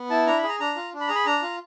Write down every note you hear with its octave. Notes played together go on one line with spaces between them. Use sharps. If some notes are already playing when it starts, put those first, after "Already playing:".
Already playing: B3
E4 A5
D4 A#5
B5
G#4
A#5
D4 A#5
F4
D4
B5
G#4 A#5
B5
D4 A#5
F4